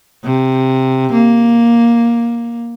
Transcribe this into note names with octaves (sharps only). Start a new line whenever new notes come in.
C3
A#3